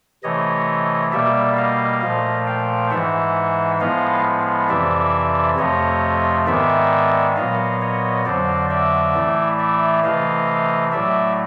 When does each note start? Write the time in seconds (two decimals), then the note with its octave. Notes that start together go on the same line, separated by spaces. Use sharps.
0.23 C3 E3 A3 C#5 D#5
1.12 B2 G3 A#3 D5 E5
1.57 D#5 F5
2.02 A#2 F3 A3
2.47 F5 G5
2.91 G#2 E3 G#3 E5 F#5
3.80 A2 F3 G#3 B3 D#5 F5
4.69 F2 C3 E3 D5 E5
5.58 F2 C3 F3 A3 C#5 D#5
6.47 G#2 D#3 G#3 B3 D5 E5
7.36 A#2 F#3 B3 D#5 F5
7.81 C#5 D#5
8.25 F2 D3 F#3 C5 D5
8.70 D5 E5
9.15 A2 E3 A3
9.59 D5 E5
10.04 C3 E3 A3 D#5 F5
10.92 A2 F#3 A3 D5 E5